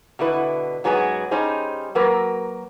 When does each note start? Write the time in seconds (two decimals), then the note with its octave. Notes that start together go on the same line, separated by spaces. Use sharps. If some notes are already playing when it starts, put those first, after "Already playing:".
0.19 B2 D3 E4 B4
0.84 G#2 F#3 B3 C#4 G#4
1.31 G3 C#4 D#4 G#4 C5
1.95 F#3 A#3 A#4 B4